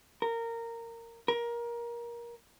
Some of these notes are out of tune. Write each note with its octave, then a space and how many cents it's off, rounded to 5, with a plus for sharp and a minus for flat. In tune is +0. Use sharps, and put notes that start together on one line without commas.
A#4 -15
A#4 +20